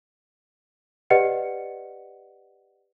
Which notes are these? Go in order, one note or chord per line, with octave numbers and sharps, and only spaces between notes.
G4 B4 D5 D#5 F#5 C#7